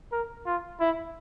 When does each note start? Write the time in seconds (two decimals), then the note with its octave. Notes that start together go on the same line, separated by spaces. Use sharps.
0.12 A#4
0.46 F4
0.80 E4